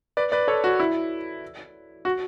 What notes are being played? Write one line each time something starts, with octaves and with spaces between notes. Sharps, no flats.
B4 D5
B4 D5
A4 C#5
F#4
E4
F#4